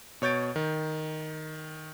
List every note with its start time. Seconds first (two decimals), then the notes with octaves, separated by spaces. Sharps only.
0.22 B2 C#5 G6 A6 D7
0.56 D#3